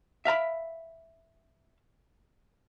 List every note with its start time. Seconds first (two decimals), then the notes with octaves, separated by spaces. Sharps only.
0.25 E5 F5 A#5 B5